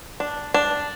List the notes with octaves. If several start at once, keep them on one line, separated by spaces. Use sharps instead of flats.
D4
D4